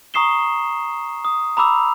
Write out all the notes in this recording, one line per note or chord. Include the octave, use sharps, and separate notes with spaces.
A#5 C#6 D#6 C7 E7 G7
D#6
A#5 B5 D6 E6 F7